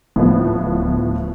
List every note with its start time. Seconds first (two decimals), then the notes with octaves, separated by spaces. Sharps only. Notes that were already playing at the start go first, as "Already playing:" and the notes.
0.16 D1 A2 F3 B3